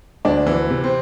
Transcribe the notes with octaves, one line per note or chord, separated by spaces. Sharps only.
D2 D4
E3
C3
C4